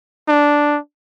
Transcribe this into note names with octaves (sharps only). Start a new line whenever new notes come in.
D4